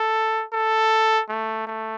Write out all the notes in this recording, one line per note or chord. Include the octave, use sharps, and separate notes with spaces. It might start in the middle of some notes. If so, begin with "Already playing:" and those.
Already playing: A4
A4
A3
A3